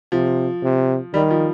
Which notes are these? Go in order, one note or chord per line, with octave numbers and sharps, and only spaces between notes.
C3 F3
C3
D#3 G3
F3